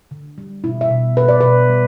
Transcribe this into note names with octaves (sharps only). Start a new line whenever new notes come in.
D3
G3
B2 E4
E5
B2
B2 B4
D5
B2 B4
G3